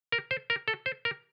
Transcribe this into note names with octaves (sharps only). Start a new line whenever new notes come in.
A#4
C5
A#4
A4
C5
A#4